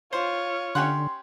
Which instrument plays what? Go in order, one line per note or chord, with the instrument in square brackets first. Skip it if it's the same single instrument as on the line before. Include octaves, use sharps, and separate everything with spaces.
[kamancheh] F4 C#5 [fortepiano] C5
[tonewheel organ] D3 [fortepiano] C#4 G4 F#5 [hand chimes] C6